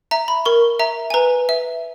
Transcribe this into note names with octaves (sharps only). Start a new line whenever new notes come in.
E5 A#5
B5
A#4 C#6
E5 A#5
G#5
B4 A#5
E5